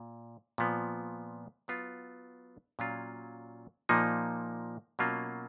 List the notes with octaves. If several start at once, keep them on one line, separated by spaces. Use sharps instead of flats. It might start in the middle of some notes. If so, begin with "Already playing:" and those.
Already playing: A#2
A#2 F3 B3
F#3 B3 F4
A#2 F#3 C#4 F4
A#2 F3 A#3 D#4
B2 F#3 A#3 C#4 F4